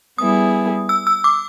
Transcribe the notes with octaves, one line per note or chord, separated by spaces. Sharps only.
G3 B3 E4 G#4 D#6
E6
E6
D6